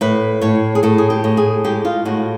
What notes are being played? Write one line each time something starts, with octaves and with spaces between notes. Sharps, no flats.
A2 B4
A2 C#5
G#4
A2 A4
G#4
G4
A2
G#4
G#3 G4
F4
A2 F#4